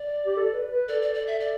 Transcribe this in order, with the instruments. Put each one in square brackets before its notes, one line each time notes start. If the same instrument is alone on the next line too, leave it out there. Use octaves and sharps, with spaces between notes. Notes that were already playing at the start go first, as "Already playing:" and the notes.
Already playing: [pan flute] D5
[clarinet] G4
A4
B4
B4
[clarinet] A4 [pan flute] D5
[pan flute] D5
D5
E5
D5